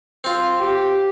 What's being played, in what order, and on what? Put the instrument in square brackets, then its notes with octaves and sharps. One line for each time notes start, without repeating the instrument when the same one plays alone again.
[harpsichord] C4 F4
[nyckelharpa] G4